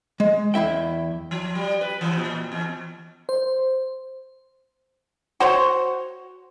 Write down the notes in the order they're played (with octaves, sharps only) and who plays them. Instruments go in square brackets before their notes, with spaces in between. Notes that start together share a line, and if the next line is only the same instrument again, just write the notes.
[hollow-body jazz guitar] G#3
E2 E4 E5 G5
[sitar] F3
G3
B4
E3
A#2
E2
[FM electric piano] C5
[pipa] F#4 C5 C#5